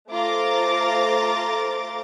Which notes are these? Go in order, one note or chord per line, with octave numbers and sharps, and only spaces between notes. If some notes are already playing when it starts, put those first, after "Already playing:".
A3 F4 C5 A#5 D6 A6